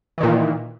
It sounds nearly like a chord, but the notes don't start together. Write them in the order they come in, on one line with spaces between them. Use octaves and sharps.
E3 D#3 A#2